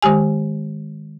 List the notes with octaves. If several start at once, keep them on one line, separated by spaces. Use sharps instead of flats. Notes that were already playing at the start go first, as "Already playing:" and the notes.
D#3 G#3 G4 G#5